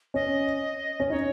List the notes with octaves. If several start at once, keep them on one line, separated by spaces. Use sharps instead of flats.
C#4 D#5
C#4
D#4 C#5